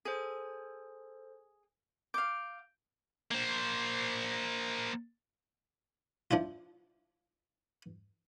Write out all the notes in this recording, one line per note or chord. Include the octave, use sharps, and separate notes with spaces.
G#4 A4 C5
F5 D6 G6 D7
A#3 C5
F3 D4 E4 F4